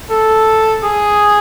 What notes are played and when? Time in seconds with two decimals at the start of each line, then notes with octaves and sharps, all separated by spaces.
0.11 A4
0.83 G#4